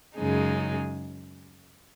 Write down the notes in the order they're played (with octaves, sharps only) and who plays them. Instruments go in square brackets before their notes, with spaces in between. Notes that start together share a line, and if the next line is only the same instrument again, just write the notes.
[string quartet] F#2 C#3 G#3 D#4 G#4